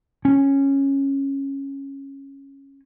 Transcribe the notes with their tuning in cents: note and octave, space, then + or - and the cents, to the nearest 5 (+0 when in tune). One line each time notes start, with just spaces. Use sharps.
C#4 -10